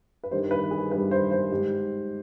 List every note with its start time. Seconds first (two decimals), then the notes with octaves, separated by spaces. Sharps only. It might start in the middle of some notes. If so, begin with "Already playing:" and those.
0.23 B4
0.31 G2 D#3 G3 C5
0.51 B4
0.71 G#4
0.91 G2 D#3 G3 B4
1.11 C5
1.31 C5
1.51 G#2 G3